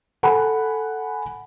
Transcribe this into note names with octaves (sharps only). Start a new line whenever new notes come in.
A4 F#5 G#5 B5